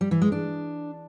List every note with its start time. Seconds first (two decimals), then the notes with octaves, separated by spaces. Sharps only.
0.01 G3
0.11 E3
0.22 G#3
0.32 D4